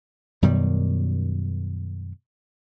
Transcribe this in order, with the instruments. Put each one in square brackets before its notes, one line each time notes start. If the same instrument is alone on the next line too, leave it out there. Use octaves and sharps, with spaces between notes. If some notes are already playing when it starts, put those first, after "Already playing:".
[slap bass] F#2 B2 D#3 G3